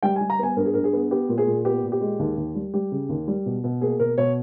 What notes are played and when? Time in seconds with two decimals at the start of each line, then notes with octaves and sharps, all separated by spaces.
0.03 G3 G5
0.16 G#5
0.21 G3
0.30 A#5
0.39 B3 G#5
0.56 G2 A#4
0.65 G#4
0.74 G2 A#4
0.84 G#4
0.93 B3
1.11 B3 G4
1.29 A#2
1.38 G#4
1.47 A#2
1.65 B3 G4
1.83 A#2
1.92 G4
2.01 G#3
2.19 D#2
2.37 D#2
2.55 G3
2.74 G3 G4
2.92 C#3
3.09 D#2
3.28 G3
3.46 B2
3.64 B2
3.81 A#3 G#4
4.00 B2 A#4
4.18 B2 C#5